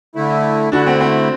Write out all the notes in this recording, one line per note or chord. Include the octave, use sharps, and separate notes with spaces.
D3 A3 E4
D3 A3 D4 E4 F#4
C4
C4